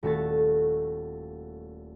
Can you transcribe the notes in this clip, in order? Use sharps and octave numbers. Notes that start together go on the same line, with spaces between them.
D#1 A3 F#4 A6